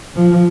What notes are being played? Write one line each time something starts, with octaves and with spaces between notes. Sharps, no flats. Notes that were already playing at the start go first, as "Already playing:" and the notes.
F3